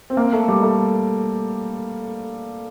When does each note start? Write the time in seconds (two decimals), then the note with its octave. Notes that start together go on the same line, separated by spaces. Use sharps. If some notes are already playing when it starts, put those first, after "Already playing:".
0.10 C4
0.17 A#3
0.33 A3
0.48 G3
0.63 A3